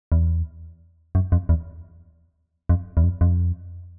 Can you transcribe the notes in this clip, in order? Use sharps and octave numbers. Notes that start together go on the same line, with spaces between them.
E2
F#2
F2
E2
F2
E2
F2
F2